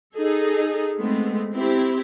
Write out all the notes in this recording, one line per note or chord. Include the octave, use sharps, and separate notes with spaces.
D#4 G#4 A4
G#3 A3 B3 C4
C4 E4 G4